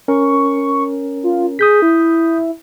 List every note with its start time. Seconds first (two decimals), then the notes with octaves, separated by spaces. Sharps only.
0.08 C#4 A#4 C#6
1.23 F4
1.59 G#4 D#6 G6 B6
1.82 E4